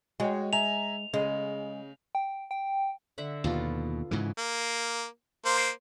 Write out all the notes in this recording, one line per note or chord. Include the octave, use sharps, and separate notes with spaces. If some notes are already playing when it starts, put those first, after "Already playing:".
G#3 F#4 C#5 G5
E5 G#5 A#5 F7
C#3 G#3
G5
G5
D3 E5 F#5
D#2 B2 B3 F4 A4
G#2 C#3 E3
A#3
A#3 C5